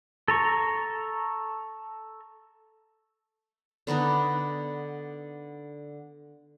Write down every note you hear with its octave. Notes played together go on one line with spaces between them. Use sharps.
A4 A#5 C#6
D3 B3 D4 D#4